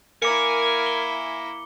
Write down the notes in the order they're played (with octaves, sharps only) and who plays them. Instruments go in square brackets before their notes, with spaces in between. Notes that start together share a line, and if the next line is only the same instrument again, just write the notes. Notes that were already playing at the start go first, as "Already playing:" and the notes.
[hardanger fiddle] A#3 E4 [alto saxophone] A#4 [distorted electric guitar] G#5 [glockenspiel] D6 C#7
[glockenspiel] G7